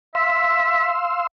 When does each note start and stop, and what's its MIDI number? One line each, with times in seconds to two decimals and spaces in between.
0.15 0.90 76
0.15 1.27 77
0.15 1.27 84
0.15 1.27 88